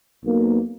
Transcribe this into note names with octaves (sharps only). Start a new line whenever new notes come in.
B1 B2 A#3